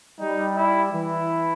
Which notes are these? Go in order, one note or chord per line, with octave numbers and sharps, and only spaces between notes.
G3 D#4
E4
E3 E4